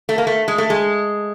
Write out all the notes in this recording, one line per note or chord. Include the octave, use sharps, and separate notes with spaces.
A3
A#3
A3
G#3
A3
G#3